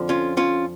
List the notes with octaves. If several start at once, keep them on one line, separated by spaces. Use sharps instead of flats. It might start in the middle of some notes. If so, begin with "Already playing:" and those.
Already playing: F2 D3 F3
C#4 F4
C#4 F4